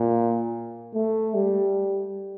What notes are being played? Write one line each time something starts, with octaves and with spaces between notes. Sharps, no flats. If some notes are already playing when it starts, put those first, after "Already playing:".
Already playing: A#2
A3
G3